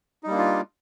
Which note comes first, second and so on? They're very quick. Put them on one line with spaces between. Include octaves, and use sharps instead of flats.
D#4 G3 A#3 D4 F4